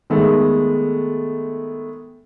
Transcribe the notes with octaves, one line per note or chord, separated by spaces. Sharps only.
D#3 G#3 A3 B3